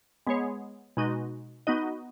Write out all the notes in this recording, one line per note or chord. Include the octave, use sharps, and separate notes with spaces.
G#3 B3 G#4 C#5
B2 G#3 D#4 F#4 D#5
B3 D#4 F#4 D#5